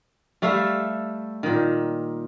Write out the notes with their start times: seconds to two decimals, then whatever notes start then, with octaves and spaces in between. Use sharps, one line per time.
0.42 G3 A3 E5 F5
1.43 A#2 D#3